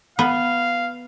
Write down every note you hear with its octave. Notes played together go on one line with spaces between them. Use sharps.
B3 F5